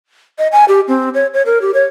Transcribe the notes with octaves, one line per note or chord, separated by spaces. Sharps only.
D#5
G#5
G4
C4
C#5
C#5
A#4
G4
C#5